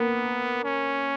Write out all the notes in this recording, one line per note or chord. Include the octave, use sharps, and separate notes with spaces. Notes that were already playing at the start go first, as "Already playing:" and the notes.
Already playing: A#3 B3
C#4